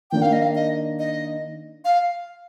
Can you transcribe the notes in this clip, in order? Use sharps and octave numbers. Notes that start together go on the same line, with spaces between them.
D#3 A#3 D4 G5
F5
D#5
F5
D#5
D#5
F5